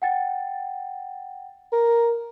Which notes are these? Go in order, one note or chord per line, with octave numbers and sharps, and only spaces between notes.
F#5 G5 A6
A#4